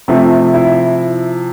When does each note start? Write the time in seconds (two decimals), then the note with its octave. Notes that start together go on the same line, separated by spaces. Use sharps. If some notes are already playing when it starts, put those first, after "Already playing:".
0.08 C3 F3 A3
0.54 E4